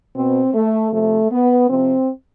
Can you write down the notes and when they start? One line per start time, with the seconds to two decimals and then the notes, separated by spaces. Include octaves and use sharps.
0.15 B2 C4
0.54 A3
0.92 C3 F3 A3
1.31 B3
1.69 C3 F3 C4